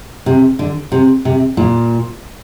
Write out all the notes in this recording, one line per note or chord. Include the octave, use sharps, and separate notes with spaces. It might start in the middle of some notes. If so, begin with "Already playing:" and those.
C3
D3
C3
C3
A#2